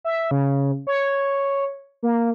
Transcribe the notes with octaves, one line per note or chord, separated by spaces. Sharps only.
E5
C#3
C#5
A#3